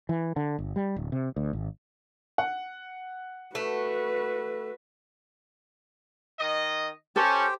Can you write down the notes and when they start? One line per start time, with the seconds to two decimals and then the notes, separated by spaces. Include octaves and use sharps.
0.09 E3
0.36 D3
0.59 G1
0.76 G3
0.96 D1
1.12 C3
1.36 D2
1.53 G#1
2.38 F#5
3.55 A3 F#4 B4
6.40 D#3 D#5
7.16 C#4 G4 A4 C5 G5